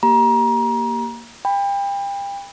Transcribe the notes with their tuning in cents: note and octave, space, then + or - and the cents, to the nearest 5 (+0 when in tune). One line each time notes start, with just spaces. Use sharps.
A#3 +0 G4 +0 A#5 +25
G5 +30 B5 +5